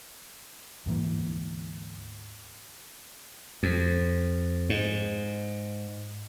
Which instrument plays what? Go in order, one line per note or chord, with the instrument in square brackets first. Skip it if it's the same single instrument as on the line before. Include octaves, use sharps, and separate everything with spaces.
[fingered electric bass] D2 G#2 E3 A#3
[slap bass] F2
G#2